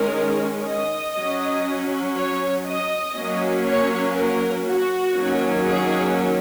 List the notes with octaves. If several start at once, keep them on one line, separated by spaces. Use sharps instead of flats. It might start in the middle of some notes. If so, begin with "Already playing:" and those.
Already playing: D#3 G#3 C#4 A#4
D#5
F#3 C#4
C#5
D#5
F#3 A#3 C#4
C#5
A#4
F#4
D#3 F#3 A#3 C#4
G#4